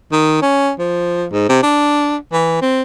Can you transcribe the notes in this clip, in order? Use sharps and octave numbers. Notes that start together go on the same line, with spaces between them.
D#3
C#4
F3
G#2
C3
D4
E3
C4